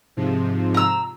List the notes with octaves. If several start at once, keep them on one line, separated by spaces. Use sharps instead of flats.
G#2 C3 F3
A#5 E6